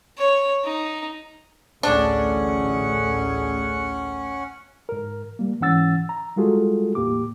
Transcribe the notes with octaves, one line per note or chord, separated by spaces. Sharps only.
C#5
D#4
A1 D2 A3 C#4 D4 G#4 F#5
G#2 A#4
G3 A#3
G#2 E3 C#4 F#5 E6 A6
A#5
G3 G#3 F4 F#4 G#4 A4
E2 A2 A#3 G4 D6